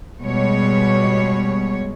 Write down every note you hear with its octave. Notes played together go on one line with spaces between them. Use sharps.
B2 G3 G#3 C#5